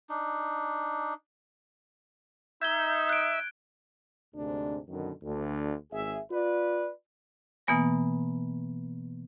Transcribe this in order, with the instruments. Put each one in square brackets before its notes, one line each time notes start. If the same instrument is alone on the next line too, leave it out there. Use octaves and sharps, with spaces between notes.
[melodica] D4 D#4
[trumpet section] D#4 [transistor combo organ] E5 [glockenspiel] G6 G#6 G7
[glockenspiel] F#6 D7
[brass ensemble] D2 G#2 C3 D4
F#2 B2 D3 D#3
D2 D4
G#1 G#4 E5
F4 B4 D5
[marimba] B2 E3 A#3 B3 G#5 A#6